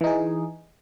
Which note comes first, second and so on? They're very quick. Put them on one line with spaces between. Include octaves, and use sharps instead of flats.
E3 D#4 G#4